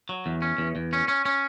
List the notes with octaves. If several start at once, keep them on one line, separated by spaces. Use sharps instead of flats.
F#3
E2
C#4
E2
E2
C#4
C#4
C#4